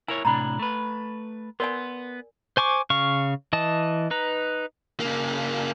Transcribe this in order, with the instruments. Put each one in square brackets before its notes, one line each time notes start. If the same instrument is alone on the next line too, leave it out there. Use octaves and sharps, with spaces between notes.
[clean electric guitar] E4 A#4 C#5 [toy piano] G#5
[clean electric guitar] A2 C3 D4 [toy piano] A#5 B5
[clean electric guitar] A3 B4
[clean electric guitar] B3 C6 [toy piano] A#4 D5 G#5
[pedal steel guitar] C5 G#5 C#6 D6
C#3 F5 C#6
E3 D#5 A5
D#4 B4 A#5
[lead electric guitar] C#3 A#3